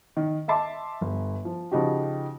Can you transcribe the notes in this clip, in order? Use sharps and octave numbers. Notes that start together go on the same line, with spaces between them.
D#3
D#5 E5 A5 C6 D6
G1
F3
C#3 F3 D#4 F#4 G4